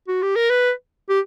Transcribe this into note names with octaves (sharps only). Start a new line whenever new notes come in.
F#4
G4
A#4
B4
G4